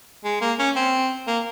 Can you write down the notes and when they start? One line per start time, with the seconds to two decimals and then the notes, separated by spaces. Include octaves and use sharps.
0.25 G#3
0.41 A#3
0.59 C#4
0.76 C4
1.27 A#3